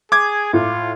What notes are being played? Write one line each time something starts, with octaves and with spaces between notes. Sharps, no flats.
G#4 D6 G#6
A2 F4